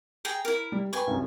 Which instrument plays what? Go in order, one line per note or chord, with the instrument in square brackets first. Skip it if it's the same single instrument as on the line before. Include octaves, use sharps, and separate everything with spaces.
[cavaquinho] G#4 G5 A#5
E4 A#4
[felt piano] G3
[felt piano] B4 G5 B5 [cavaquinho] G#5 C#6
[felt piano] C2 F#2